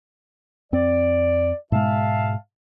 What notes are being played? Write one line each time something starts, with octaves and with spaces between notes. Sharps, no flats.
F2 C4 D5
G#2 B2 G#3 E5 F5 A5